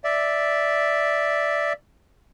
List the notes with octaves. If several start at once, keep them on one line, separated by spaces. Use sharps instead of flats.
D5 E5